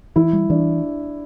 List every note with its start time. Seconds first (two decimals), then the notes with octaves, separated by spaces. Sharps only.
0.16 E3 E4
0.33 G3
0.50 E3 D4